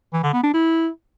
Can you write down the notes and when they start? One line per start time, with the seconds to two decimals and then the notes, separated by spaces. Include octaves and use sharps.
0.13 E3
0.23 D3
0.33 B3
0.43 D4
0.54 E4